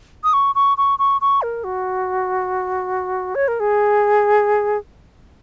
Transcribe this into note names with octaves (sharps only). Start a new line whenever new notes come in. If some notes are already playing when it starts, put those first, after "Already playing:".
D#6
C#6
C#6
C#6
C#6
C#6
A#4
F#4
C#5
A#4
G#4